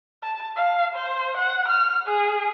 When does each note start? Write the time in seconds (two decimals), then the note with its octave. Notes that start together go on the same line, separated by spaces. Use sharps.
0.23 A5
0.56 F5
0.95 C5
1.37 F#5
1.68 F6
2.07 G#4